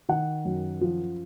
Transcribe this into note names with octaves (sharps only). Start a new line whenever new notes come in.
D#3 F#5
F#2
F3